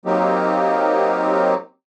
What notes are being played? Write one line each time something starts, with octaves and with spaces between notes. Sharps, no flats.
F#3 A#3 C4 D#4 G4